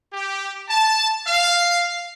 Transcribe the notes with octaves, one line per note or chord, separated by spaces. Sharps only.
G4
A5
F5